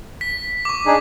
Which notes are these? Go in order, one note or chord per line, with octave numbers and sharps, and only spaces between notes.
B6
C#6 D6
D4 D#4 G#4